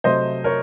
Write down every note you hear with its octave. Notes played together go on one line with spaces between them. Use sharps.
C3 F#3 A3 C5 D#5
A#4 C#5